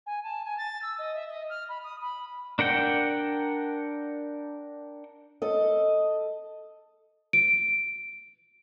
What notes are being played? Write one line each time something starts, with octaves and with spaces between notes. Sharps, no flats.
G#5
A5
G#5
A6
E6
D#5
E5
D#5
F6
B5
D#6
B5
D4 A#4 F#5 G5
A4 D#5
D7